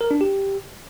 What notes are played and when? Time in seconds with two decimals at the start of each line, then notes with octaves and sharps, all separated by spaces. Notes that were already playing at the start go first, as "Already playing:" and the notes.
0.01 A#4
0.11 D4
0.21 G4